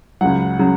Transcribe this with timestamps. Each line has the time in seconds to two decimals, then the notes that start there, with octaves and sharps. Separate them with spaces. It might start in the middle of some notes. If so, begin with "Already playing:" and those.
0.21 C#2 C#3 F#3 F#5
0.59 C#3 F#3